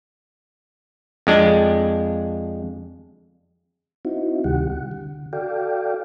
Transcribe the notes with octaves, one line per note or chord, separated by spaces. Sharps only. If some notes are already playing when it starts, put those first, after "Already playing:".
F2 G#3 D4
C4 D#4 E4 F#4
D2 C3 D#3 G3 G4 F#5
F#5
D3
F#4 A4 D5 F5 G5